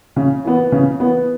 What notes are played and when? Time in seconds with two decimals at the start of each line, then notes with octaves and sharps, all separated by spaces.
0.16 C#3
0.45 E3 B3
0.72 C#3
1.00 E3 B3